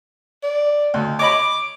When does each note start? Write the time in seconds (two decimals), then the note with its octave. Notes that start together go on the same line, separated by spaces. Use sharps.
0.43 D5
0.94 D2
1.19 C#5 D#5 B5 D6